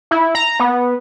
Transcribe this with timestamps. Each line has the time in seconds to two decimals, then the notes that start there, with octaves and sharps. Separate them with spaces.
0.11 E4
0.35 A#5
0.60 B3